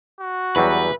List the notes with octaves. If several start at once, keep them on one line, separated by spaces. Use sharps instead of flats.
F#4
E2 F#3 G3 B4